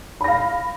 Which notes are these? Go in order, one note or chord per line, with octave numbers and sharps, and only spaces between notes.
F5 B5 A#6